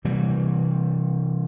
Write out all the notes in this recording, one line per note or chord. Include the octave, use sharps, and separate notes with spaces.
C3 E3 G3